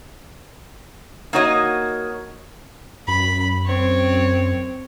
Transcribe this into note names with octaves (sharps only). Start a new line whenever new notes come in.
A#3 D#4 F#4 C#5 D#5
F#2 B5
C4 C#5